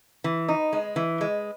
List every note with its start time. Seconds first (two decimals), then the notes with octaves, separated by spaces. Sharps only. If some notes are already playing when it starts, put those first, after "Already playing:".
0.24 E3
0.48 D#4
0.73 G#3
0.96 E3
1.21 G#3